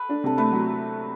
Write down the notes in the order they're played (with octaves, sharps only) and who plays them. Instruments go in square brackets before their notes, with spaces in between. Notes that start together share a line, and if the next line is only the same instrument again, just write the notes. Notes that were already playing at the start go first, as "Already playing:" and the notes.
Already playing: [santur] A4 B4
[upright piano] D4
[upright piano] C3 [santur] A4
[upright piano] A3 [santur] B4
[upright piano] F#3